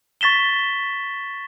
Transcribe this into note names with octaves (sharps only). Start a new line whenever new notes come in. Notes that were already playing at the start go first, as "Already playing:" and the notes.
C#6 A6 B6 E7 G7